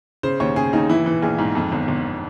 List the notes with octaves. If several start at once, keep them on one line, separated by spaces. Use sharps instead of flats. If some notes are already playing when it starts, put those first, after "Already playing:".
C#3 C5
D#2 C#5
C#3 G#4
D#2 D#4
E3 E4
E3
A#1 G#4
G#2
F2
G1
G1